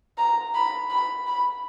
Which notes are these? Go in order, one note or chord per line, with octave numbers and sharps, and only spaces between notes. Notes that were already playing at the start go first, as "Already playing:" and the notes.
A#5
B5
B5
B5